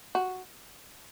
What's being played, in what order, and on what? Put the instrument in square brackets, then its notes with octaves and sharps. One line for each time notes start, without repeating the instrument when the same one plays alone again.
[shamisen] F#4